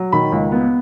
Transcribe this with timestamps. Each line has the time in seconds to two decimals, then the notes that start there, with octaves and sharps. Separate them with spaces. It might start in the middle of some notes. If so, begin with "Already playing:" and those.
Already playing: F#3
0.12 D#3 B5
0.32 C#2
0.52 B3